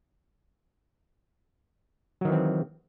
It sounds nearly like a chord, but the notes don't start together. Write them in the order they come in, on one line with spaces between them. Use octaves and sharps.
F#3 D#3 E3 C4